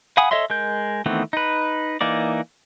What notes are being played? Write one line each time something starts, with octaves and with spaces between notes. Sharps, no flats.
F5 F#5 G#5 B5 D#6
A4 C#5 D#5 E5 C6
G#3 A#4 G6
D#3 E3 A3 B3 C4
D#4 B4
E3 A#3 D#4 D5